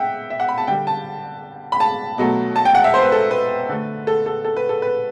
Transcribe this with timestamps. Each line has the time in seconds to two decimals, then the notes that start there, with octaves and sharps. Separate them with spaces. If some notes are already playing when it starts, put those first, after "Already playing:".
Already playing: E5 F#5 G5
0.30 E5
0.40 F#5
0.49 B5
0.58 A5
0.67 D3 G3 G5
0.87 A5
1.72 B5
1.80 A5
2.18 B2 F#3 A3
2.56 A5
2.65 G5
2.75 F#5
2.84 E5
2.94 C5
3.03 B4
3.12 A4
3.31 B4
3.69 D3 A3
4.07 A4
4.26 A4
4.45 A4
4.57 B4
4.69 A4
4.82 B4